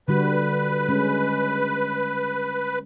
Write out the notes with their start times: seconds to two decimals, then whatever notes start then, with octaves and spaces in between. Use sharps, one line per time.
0.08 D3 G3 F#4 B4
0.89 G#3 C#4